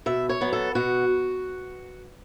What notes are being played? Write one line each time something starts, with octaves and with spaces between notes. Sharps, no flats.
B2 E5
C#5
F#3 B3
A4
B2 F#4